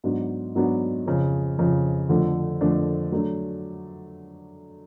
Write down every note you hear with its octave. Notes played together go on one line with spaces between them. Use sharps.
G#2 F#3 B3 D4 F#4
G#2 F#3 B3 D4 F#4
F2 C#3 F3
F2 C#3 F3
F2 D3 F3 A3 D4
F2 D3 F3 A3 D4
F#3 A3 D4